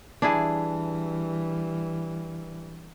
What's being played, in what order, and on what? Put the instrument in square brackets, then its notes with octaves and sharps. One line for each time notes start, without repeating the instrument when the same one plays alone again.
[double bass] E3 G3 [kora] D4 E4 G#4